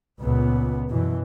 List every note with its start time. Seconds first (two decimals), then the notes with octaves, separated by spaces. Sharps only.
0.19 C#2 A#2 B3
0.88 F#2 B2 E3